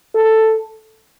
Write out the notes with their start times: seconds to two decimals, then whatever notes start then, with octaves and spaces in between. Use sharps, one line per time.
0.15 A4